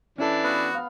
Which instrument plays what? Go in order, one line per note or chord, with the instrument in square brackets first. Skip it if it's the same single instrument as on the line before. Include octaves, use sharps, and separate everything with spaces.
[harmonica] E3 D4 [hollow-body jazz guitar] C#4 E4 A4
[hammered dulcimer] B3 [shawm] F#4
[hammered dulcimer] F5 F#5 B5